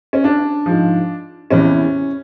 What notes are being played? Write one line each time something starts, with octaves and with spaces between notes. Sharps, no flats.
C#4
D4
G#2 F3
E2 C3 E3 C#4